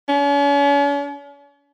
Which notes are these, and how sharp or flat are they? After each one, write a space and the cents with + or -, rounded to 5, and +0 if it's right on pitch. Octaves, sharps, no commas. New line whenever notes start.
C#4 +45